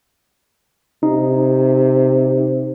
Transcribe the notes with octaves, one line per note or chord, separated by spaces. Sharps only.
C3 D#4